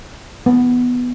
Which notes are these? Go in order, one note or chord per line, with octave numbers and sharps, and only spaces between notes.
B3